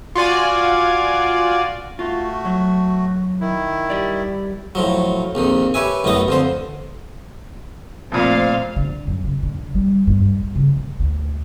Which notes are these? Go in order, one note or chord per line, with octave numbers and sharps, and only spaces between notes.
F4 F#4 D5 G#5
A3 F4 F#4
F#3
D#3 E4
G3 D5
A2 F3 F#3
A#1 F2 D#3
G4 B4 C#5 E5 G#5
A1 F#2 A2 B3 D#5 D#6
F2 D3 C5
F2 A#2 A3 C5 F5
D3
F#2
C#3
D3
G3
G2
G2
C#3
D#3
D2